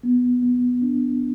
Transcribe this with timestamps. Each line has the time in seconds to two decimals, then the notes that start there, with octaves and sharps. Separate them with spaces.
0.03 B3
0.42 B3
0.82 D4